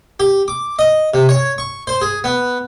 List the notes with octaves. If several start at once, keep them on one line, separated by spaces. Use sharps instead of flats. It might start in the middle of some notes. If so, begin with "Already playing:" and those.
G4
D6
D#5
C3
C#5
C#6
C5
G#4
B3